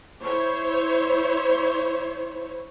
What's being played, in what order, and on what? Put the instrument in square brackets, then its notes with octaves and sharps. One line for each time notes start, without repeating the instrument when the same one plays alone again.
[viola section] E4 C5 C#5